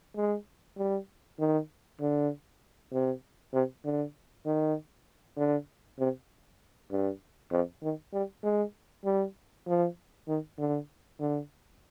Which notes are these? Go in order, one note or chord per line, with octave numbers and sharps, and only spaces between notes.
G#3
G3
D#3
D3
C3
C3
D3
D#3
D3
C3
G2
F2
D#3
G3
G#3
G3
F3
D#3
D3
D3